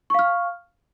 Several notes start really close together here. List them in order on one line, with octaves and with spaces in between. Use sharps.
C#6 F5 F6